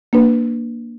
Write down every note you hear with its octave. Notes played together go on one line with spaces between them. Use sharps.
A#3 D4 B4